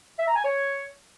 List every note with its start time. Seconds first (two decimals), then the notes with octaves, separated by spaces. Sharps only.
0.19 E5
0.27 A#5
0.36 G#5
0.44 C#5